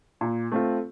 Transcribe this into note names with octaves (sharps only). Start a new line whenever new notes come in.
A#2
A3 C4 F4